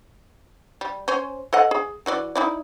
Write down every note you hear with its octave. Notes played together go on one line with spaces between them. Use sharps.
G3
C#4 C5
A4 D#5 F#5
G#4
E3 F#4 D5
D#4 E4 D5